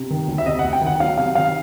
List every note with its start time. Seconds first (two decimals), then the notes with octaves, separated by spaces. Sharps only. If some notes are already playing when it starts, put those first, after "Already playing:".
Already playing: C3
0.10 D#3
0.28 D2
0.38 E5
0.46 C3 D#5
0.59 F#5
0.64 D2
0.73 G5
0.81 D#3
0.86 F#5
1.00 F#3 F5
1.18 C3 F5
1.35 D#3 F5